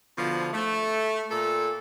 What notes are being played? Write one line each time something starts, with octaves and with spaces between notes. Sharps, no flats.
B2 D3 F3
A3
A#2 A4